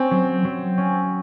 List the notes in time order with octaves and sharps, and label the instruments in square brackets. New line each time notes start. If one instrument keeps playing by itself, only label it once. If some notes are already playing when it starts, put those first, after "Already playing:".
Already playing: [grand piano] C4 [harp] C#4
[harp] F#3
F#3
C#4